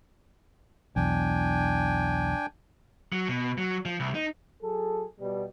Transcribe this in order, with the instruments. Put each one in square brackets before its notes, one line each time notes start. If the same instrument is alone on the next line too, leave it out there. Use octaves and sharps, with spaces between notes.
[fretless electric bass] B1 E2 [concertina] D4 G5 G#5
[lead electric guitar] F#3
B2
F#3
F3
C2
D#4
[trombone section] F#3 G#4 A4
B2 G3